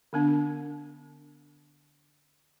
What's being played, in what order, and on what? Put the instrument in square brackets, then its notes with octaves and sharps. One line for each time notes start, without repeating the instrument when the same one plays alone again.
[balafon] D3 B3 D4